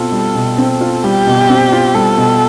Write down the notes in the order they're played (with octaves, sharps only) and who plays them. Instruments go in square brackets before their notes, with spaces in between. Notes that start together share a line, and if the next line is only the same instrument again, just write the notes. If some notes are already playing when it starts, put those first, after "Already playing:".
Already playing: [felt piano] B2 C4 F4 [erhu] A4
[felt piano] G3
B2
C4
F4
[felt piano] G3 [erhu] G4
[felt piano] B2
C4
F4
[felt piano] G3 [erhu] A4
[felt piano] B2